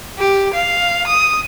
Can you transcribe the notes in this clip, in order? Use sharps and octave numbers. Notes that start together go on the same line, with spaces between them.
G4
F5
D#6